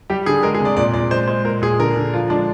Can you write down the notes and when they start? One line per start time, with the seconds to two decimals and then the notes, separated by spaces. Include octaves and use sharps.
0.10 G3 G4
0.26 D3 G#4
0.43 G#3 A#4
0.55 G#4
0.60 C3
0.65 D5
0.77 A#2 D5
0.94 A#2 D5
1.11 G#3 C5
1.28 G#3 C5
1.45 A#2 A#4
1.62 A#2 G#4
1.79 D3 A#4
1.96 D3
2.14 F3 F4
2.30 G#3 D4